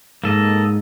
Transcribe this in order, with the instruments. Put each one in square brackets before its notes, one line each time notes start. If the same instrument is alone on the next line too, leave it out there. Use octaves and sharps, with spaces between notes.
[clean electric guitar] G#2 [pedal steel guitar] A#3 A4 D#5